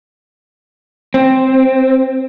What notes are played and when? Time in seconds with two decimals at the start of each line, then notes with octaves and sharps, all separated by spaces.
1.14 C4